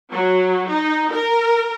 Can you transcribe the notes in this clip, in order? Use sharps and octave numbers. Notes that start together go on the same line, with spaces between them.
F#3
D#4
A#4